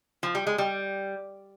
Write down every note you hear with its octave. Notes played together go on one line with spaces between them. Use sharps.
F3
G3
G#3
G3